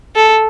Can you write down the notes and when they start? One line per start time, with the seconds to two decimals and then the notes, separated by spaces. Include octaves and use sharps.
0.16 A4